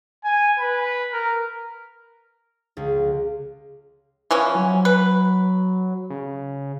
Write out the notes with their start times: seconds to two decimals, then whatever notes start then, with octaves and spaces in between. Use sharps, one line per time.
0.24 G#5
0.60 B4
1.13 A#4
2.77 C#2
4.31 E3 F3 C#4 E4
4.55 F#3
4.85 B4
6.10 C#3